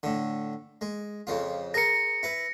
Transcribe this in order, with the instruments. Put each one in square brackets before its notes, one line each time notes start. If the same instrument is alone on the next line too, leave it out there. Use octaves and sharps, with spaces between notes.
[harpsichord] A2 D3
G#3
F2 C#3 F4
[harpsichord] G#4 A#4 C6 [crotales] A#6 C#7
[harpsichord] E4 B4